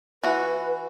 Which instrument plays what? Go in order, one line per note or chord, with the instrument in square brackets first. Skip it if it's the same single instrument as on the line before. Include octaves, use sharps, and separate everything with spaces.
[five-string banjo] E3 F#4 [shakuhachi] B4